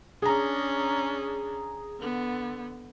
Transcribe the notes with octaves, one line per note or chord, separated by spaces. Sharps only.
C#4 D4 G#4 A#5
D3 B3